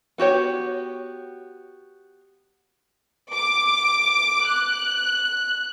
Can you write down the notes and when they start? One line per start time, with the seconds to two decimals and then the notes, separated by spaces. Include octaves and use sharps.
0.18 B3 F#4 G4 C#5
3.32 D6
4.48 F#6